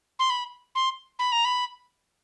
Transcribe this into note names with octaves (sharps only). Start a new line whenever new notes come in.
C6
B5
C6
B5
A#5
B5